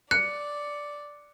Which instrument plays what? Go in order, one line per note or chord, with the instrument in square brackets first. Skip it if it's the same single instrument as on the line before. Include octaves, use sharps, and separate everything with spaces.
[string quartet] D5 [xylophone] F#6 [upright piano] C#7